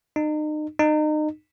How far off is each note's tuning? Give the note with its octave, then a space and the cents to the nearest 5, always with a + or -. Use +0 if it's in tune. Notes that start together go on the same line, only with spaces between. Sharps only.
D#4 -35
D#4 -30